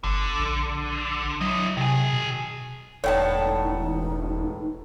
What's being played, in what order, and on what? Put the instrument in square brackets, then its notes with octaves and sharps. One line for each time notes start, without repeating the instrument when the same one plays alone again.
[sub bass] G1 [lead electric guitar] D3
[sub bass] A#1
[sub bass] F#3 [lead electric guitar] E4 D#5
[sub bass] C3 [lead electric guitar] D#3 G#4
[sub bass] B2
[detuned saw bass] E1 [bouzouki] A2 B3 A5 [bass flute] D#4 [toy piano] C#5 D5 G5